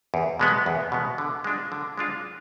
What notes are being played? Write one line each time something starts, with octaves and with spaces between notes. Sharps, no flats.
E2
B2 G#3 B3
E2
B2 G#3 B3
D3
G#3 D4 F4
D3
G#3 D4 F4